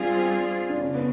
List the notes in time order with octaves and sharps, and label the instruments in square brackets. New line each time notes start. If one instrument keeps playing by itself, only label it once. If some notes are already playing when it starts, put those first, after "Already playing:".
Already playing: [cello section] G3 C4 F4 G#4 [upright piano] D4
[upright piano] D4
[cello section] C#3 [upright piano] C#4
[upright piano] B3